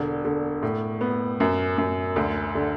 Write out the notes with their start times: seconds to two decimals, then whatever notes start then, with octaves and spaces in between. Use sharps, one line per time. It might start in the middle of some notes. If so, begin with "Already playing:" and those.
Already playing: E1 D3
0.25 D3
0.63 A2
1.01 B3
1.40 F#2
1.78 F#2
2.16 D2
2.55 D3